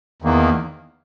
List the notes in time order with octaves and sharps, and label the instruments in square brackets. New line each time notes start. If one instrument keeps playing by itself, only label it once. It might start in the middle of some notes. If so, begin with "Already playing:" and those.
[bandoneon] E2 D#3 A#3